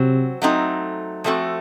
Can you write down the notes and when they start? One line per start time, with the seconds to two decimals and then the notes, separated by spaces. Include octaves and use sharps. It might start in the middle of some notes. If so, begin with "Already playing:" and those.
Already playing: C3 F#3 C4 F#4
0.42 F#3 A3 C4 D#4
1.24 F3 A3 C4 F#4